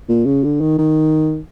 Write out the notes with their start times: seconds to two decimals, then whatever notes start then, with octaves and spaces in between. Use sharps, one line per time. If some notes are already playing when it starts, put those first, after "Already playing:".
0.09 A#2
0.26 C#3
0.44 D3
0.61 D#3
0.78 D#3